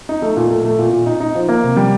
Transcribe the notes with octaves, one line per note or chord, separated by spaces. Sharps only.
D#4
A3
A#2
A3
A3
A#2
A#2
D#4
D#4
F3
A#3
C3
G3